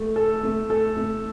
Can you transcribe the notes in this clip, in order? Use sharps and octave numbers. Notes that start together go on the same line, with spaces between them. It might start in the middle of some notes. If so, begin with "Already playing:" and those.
Already playing: A3
A4
A3
A4
A3